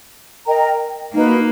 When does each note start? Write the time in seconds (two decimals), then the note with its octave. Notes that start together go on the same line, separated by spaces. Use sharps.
0.46 A#4 D#5 G5 A#5
1.13 A#3 D#4 F#4 B4